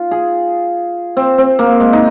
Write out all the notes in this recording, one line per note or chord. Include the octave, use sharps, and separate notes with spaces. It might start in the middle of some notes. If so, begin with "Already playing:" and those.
Already playing: F4
G#4
C4
C4
A#3
G#3
D#4